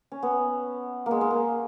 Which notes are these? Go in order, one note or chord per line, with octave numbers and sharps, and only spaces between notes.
C#4
B3
G#3 A#3
G#3
A#3